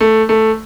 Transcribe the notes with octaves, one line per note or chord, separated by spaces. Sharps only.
A3
A3